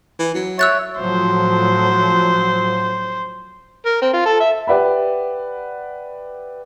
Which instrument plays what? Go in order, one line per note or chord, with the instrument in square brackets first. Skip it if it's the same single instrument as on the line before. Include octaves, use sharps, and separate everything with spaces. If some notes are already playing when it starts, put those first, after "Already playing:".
[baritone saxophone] E3
F#3
[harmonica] C#5 E5 [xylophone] E6 F#6 A6
[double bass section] A2 F3 F#3 [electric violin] C5
[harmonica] A#4
C4
F4
A4
E5
[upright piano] G4 B4 D5 E5 F#5 B5